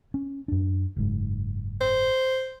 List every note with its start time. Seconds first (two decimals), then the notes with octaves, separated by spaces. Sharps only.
0.14 C#4
0.48 F#2 D4
0.97 F#1 G#2
1.80 C5